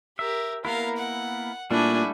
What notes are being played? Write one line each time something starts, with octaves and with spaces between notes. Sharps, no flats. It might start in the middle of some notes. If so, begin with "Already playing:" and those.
G4 A#4 E5
A#3 B3 E4 A#4 F5
F#5
A#2 G3 A3 D4 E4 F#4 G#5